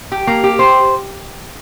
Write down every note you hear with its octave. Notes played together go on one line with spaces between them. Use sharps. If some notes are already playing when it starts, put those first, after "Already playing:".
G4
A#3
G4
C5